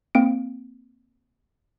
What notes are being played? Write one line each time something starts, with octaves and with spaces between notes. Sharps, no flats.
A#3 C4 D7